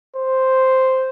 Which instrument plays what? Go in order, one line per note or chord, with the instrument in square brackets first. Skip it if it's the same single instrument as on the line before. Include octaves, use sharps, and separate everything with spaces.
[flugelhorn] C5